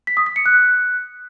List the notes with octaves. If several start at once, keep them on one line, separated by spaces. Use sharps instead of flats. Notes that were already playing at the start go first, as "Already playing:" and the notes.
B6
D#6
B6
C#7
F#6